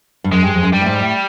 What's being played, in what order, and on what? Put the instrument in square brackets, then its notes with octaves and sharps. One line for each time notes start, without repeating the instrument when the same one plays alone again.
[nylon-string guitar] G2
[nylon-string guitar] F#2 [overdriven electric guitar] G#3
[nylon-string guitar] G2
F2
F#2
[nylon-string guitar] G2 [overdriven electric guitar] G3
[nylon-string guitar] A2
G#2
A2